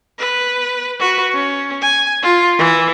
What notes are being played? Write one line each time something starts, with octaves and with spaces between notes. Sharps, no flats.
B4
F#4 B4
C#4
G#5
F4
E3